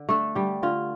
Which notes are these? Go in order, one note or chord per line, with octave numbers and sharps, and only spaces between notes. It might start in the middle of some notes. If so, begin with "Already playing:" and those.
Already playing: D3
A3 D4 A4
D3 G3 G4
D3 F4